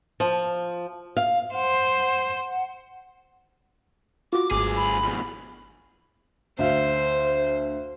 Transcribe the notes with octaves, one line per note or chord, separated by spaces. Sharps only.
F3
F5
C5 F#5
F4 F#4 D6
G#1 D2 G#4 D6
B5
F2 B2
D2 C5 E5 F5